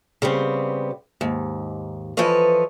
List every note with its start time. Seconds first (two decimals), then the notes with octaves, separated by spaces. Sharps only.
0.22 C#3 G3 B3 C4
1.21 D#2 G#2
2.17 E3 F3 A4 B4 C#5 D#5